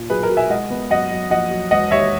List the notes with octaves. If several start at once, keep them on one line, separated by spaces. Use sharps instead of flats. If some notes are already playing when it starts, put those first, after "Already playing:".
Already playing: A#2
B1 G#4 B4
A#4
B2
E5 G#5
G#3 D#5 F#5
B3
F#2 D#5 F#5
F#2
A#1 D#5 F#5
F#3
E1 D#5 F#5
D#2 C#5 E5